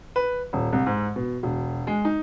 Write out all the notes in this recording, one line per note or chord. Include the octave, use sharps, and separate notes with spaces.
B4
D#1
C2
G#2
B2
E1
G#3
D#4